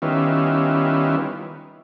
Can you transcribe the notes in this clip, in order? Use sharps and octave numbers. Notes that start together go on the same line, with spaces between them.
D#3 G3 B3 C#4 E4 F4